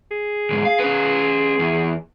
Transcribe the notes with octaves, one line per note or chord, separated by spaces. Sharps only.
G#4
D2 G#2
F5
C#4 B4
E2